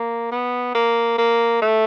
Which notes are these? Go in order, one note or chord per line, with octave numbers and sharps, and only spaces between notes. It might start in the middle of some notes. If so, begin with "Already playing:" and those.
Already playing: A#3
B3
A#3
A#3
A3